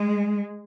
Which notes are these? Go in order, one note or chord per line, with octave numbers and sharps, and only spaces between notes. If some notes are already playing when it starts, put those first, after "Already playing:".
Already playing: G#3